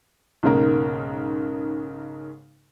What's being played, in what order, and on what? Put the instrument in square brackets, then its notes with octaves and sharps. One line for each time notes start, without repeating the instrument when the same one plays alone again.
[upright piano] B1 G#2 C#3 A#3 A#4